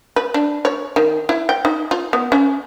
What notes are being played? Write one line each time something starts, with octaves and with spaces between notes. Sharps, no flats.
B4
D4
C#5
D#3
E4
G5
D#4
F4
B3
C#4